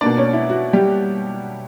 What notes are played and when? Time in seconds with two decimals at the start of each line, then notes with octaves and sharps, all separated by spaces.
0.01 B2 A#3 D4 D5
0.17 C#4 C#5
0.33 E4
0.50 F#4
0.73 G3 G4